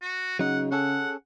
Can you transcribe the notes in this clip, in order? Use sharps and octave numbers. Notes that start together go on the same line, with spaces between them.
F#4
C#3 F#3 D#4 F#5
C#4 G#4 A4 F#5